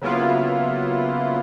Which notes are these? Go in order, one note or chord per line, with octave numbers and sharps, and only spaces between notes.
C#3 F#3 A#3 B3 E4 F4